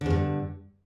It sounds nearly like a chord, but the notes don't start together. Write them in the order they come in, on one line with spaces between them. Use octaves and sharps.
D3 E2 G2